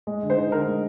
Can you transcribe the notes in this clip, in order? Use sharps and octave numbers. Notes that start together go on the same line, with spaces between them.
G#3
D3
C5
D#4
D3 A#4
G#3